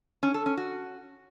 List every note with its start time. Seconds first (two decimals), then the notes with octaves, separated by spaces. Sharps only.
0.23 C#4
0.34 A4
0.46 C#4
0.57 F#4